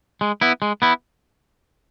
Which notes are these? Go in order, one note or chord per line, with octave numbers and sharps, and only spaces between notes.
G#3
B3 E4
G#3
B3 E4